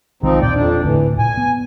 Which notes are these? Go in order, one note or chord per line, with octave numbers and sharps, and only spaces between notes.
B1 D#3 F3 G#3 C4 D#4
E1 A#2 A#3 D5 G5
F2 D4
D1 D2 E3
A#2 G#5
B3